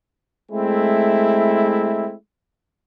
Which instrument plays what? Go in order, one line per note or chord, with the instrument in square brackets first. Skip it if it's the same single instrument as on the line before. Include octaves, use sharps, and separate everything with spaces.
[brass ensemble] G#3 A3 C4 E4